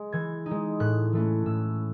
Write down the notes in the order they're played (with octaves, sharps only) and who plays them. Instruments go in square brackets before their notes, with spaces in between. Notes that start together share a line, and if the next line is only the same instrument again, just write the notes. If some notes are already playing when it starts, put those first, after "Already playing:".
Already playing: [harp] G#3
E3 G#6
D#4
G#3
A2 F#6
E3 A3 C#4
A2 E6